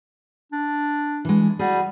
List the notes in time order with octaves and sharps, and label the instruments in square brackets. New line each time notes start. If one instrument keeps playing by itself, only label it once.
[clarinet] D4
[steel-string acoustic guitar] E3 G#3
[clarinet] G3 [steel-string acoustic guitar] F#4 G#4